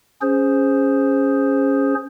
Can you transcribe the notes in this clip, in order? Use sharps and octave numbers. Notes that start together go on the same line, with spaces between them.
C#4 G#4 C5